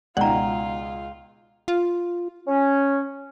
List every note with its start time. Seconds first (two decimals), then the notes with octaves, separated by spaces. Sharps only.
0.17 C#2 B2 D#4 F4 D5 F#5 G5 A#5
1.68 F4
2.47 C#4